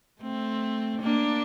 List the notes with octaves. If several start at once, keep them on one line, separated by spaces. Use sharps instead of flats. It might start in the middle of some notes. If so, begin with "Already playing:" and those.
A3 C4
A#3 D4